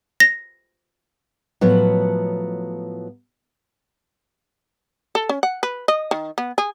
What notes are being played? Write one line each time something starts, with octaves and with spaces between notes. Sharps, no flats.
A#6
A2 F3 F#3 B3
A4
C#4
F#5
B4
D#5
D#3
B3
G#4